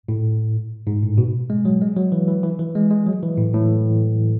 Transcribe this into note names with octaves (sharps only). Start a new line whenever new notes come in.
A2
G#2
A2
B2
G#3
F#3
G#3
F#3
E3
E3
E3
E3
G#3
G#3
F#3
E3
A2
A2